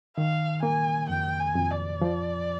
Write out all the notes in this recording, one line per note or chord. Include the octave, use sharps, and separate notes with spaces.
D#3 F5
A#3 G#5
F2 G5
G#5
F2
D5
F3